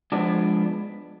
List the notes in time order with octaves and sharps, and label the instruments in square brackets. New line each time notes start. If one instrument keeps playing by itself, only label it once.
[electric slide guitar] F3 G#3 B3 D4